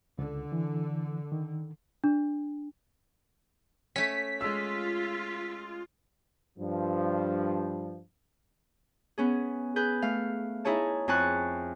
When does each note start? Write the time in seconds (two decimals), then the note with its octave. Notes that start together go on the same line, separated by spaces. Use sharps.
0.19 C#2 D3
0.52 E3
1.32 D#3
2.04 D4
3.96 A3 C#4 B6
4.41 G#3 F4 E6
6.58 G2 F3
9.18 B3 C#4 G#4
9.76 G#4 B4 G6
10.02 A3 F5
10.65 D#4 E4 G#4 C#5 A5
11.08 F2 E4 G#5 A5 C#6 F#6